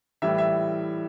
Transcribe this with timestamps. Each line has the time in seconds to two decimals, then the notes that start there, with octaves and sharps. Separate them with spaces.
0.22 A2 E3 G3 E5
0.38 E5